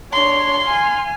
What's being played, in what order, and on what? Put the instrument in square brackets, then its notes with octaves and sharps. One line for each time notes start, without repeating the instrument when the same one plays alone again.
[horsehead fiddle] D4 C#5 [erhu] C6
[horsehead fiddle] F5 G#5